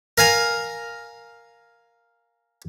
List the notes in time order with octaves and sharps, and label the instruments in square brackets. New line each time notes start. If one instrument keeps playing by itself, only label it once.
[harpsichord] A#4 F5 G#5 A#5